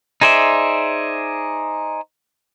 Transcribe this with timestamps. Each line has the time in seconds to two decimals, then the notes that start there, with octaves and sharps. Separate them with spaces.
0.21 D#4 G#4 C5 D5 E5